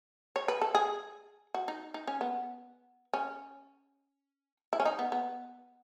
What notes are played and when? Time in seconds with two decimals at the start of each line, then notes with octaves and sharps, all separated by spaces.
0.36 C#5
0.48 B4
0.61 A4
0.75 G#4
1.54 F#4
1.68 D#4
1.94 D#4
2.07 C#4
2.21 B3
3.14 C#4
4.73 E4
4.80 C#4
4.85 D#4
4.99 B3
5.12 B3